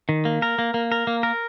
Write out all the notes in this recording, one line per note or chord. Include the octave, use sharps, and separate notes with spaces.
D#3
A#3
A#4
A#3
A#3
A#4
A#3
A#4